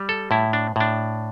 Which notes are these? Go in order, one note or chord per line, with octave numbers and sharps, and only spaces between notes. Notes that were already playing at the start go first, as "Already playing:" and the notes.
Already playing: G3
A4
A2 E4
D4
A2 D4